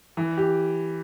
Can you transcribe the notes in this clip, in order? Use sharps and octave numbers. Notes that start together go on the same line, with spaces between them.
E3
G4